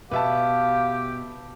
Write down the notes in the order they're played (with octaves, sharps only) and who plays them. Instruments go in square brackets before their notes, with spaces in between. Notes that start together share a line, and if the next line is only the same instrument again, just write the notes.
[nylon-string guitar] B2 [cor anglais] G4 [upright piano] B4 E5 A5 [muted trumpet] F5